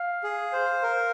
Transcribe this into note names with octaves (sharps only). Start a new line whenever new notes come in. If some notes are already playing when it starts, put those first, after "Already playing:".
Already playing: F5
G#4
C5
A#4